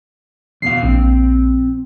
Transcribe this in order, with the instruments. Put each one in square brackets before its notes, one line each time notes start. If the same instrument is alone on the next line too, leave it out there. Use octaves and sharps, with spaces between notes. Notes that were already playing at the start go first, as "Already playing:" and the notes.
[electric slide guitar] E2 B2 F5 [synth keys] C7
[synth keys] A#1 [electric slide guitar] C4